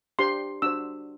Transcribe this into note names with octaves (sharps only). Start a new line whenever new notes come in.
D4 G4 C5 C6
D4 F#4 C5 E6